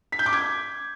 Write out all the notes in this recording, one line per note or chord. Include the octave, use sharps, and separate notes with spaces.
B6
G6
D6
G#6